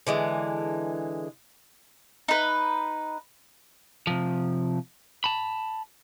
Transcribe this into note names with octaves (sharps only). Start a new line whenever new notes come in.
D3 E3 G#3
D#4 B4
C3 F3
A5 B5